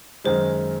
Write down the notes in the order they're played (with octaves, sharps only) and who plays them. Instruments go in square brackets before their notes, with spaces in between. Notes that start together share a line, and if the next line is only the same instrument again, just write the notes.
[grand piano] F#2 D#3 G#3 [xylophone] C5